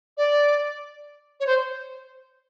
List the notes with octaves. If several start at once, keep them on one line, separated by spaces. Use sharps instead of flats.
D5
C#5
C5